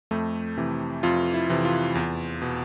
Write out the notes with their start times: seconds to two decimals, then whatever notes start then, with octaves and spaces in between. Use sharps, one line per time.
0.11 F2 A3
0.57 C3 E3
1.03 F2 F4
1.34 E4
1.49 C3 E3
1.65 F4
1.95 E2
2.42 B2